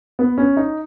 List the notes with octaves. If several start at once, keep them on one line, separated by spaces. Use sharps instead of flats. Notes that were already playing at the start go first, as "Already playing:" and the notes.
B3
C#4
D#4